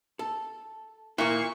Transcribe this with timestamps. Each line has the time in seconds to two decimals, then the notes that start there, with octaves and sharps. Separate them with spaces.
0.19 A4
1.18 A#2 F3 A#3 E4 C#6